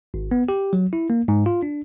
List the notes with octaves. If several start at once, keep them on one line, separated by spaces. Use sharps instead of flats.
G#1
B3
G4
F#3
E4
A#3
G#2
F4
D4